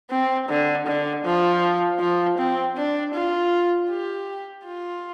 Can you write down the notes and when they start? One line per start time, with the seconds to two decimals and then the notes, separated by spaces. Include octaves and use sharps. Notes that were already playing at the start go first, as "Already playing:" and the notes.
0.10 C4
0.49 D3
0.87 D3
1.25 F3
2.00 F3
2.38 C4
2.77 D4
3.14 F4
3.90 G4
4.65 F4